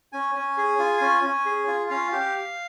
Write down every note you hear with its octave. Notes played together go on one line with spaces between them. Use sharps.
C#4 G#5
C#4
G#4
F4
C#4
C#4
G#4
F4
C#4 F5
G4